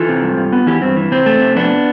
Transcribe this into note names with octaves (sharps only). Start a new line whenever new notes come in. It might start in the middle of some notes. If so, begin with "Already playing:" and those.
Already playing: E3 F4 A4
C3
G2
G2
B3
E3 E4 G4
G2 C4
E3
C3 C4
A3
C3
F2 B3 D4